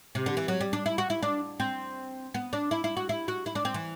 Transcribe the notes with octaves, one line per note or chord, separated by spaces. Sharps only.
C3
D3
E3
F#3
G3
D4
E4
F#4
E4
D4
C4
B3
D4
E4
E4
F#4
E4
F#4
E4
D4
C4
E3